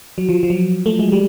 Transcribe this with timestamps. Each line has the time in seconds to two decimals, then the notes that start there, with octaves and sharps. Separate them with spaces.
0.18 F#3
0.29 F3
0.43 F3
0.50 F#3
0.86 A3
0.99 G#3
1.12 G3